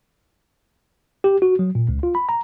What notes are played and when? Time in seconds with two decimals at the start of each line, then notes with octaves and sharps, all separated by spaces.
1.24 G4
1.42 F#4
1.59 F#3
1.75 A#2
1.89 C#2
2.03 F4
2.15 B5
2.29 A#5